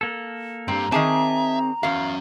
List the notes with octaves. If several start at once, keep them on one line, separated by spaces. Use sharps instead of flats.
A#3 A4
G2 C4 G4 A#5
D#3 C4 G#4 E5 G#5 A5 D6
E2 C#4 F#4 F5